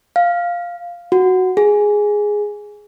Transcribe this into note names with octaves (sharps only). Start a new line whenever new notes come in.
F5
F#4
G#4